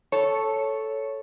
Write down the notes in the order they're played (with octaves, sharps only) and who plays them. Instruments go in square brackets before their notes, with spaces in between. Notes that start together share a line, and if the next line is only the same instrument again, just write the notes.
[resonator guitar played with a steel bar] A4 [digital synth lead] C#5